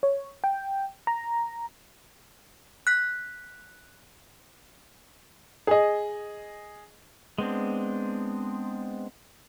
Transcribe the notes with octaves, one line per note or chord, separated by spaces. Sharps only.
C#5
G5
A#5
F#6 B6
G#4 D#5
G#3 B3 C4 D4